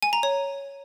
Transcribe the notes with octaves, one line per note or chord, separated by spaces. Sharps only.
G#5
A#5
C#5